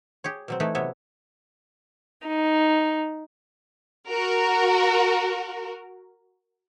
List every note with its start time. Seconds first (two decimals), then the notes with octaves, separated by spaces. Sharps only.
0.24 G4 G#4 C#5
0.48 B2 F#3 C4
0.60 E3 A3 D#4 E4 B4
0.75 C3 F#3 B3 C#5 E5
2.28 D#4
4.08 F#4 A#4